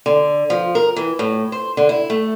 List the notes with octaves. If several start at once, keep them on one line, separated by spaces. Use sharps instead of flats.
D3
F3
A#4
E3
A2
C5
D3
E4
A3